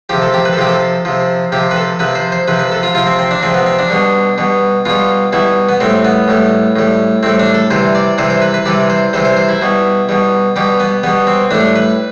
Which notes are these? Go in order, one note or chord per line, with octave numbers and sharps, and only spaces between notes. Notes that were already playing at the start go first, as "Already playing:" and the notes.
C3 F3 G4
A4
G4
B4
A4
C3 F3 G4
A4
C3 F3
C3 F3 G4
B4
A4
C3 F3 B4
C5
C5
C3 F3 B4
B4
A4
F4
C3 F3 F4
C4
C4
D4
C3 F3 C4
B3
C4
D4
B2 G3
B2 G3
B2 G3 F4
B2 G3 E4
B3
A2 G3 C4
B3
A2 G3
A2 G3
A2 G3 C4
D4
A4
C3 E3 G3 C5
D5
C3 E3 G3 C5
C5
B4
B4
C3 E3 G3 D5
C5
C3 E3 G3 C5
C5
C5
E4
B2 G3
B2 G3
B2 G3 G4
B3
B2 G3 B3
C4
A2 G3 D4
B4